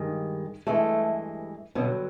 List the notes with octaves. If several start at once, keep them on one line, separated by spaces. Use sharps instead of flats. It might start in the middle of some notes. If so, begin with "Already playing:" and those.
Already playing: G2 D#3 G#3
G2 E3 G#3 A3
G2 B2 D3 F#3 B3